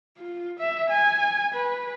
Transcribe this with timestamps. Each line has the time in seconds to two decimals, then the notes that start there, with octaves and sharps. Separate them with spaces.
0.18 F4
0.59 E5
0.90 G#5
1.54 B4